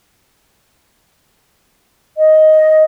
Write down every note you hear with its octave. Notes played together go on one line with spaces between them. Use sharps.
D#5